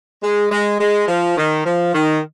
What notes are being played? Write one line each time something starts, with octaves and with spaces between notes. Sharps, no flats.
G#3
G#3
G#3
F3
D#3
F3
D#3